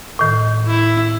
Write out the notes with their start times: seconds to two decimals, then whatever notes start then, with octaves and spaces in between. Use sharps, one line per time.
0.19 A2 D#3
0.67 E4